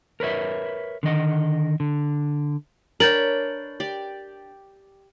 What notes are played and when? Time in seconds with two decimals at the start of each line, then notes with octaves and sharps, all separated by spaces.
0.20 A#4 B4 C#5 E5
1.03 D3 D#3 D#5 F#5
1.80 D3
3.00 D4 A#4 B4 C#5 G6 A6 F#7
3.80 G4 D5